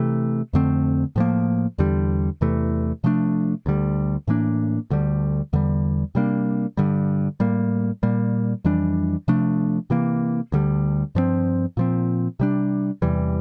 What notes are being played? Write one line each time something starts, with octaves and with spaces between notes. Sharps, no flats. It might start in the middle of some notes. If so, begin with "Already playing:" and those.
Already playing: C3 E3 A3
F2 D3 A3 C4
A2 F3 A#3
E2 D3 G3
E2 C3 E3 A3
C3 F3 A3 D4
D2 D3 G3
A2 E3 A#3 D4
D2 D3 G3
E2 D3 G3
C3 G3 A#3 D4
G2 D3 G3
A2 G3 A#3
A#2 G3 A#3
F2 E3 G3 D4
C3 F3 A3 D4
C3 E3 A#3
D2 D3 G3
G2 F3 A3 C4
A#2 F3 C4
C3 G3 D4
E2 C3 E3 G3